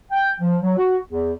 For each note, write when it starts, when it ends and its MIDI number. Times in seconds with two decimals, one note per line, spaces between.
0.11 0.34 79
0.40 0.55 53
0.62 0.75 54
0.76 0.96 66
1.08 1.32 40